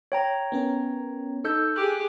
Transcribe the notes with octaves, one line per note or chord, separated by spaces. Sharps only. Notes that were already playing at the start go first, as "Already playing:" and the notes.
C#5 G5 A#5
B3 C#4 A#4
D#4 A4 E6 G6 C#7
G4 G#4 F#6